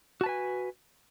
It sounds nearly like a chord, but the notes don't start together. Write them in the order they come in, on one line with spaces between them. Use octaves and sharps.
F#4 A5 B4 G#5